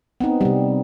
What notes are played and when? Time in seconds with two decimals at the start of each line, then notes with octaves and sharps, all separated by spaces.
0.20 B3 C4 D#4
0.41 C3 G3